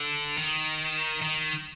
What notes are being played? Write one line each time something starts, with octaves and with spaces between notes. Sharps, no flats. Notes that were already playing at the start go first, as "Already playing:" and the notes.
Already playing: D3
D#3
D#3